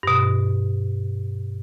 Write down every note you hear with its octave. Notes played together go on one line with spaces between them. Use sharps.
G2 B2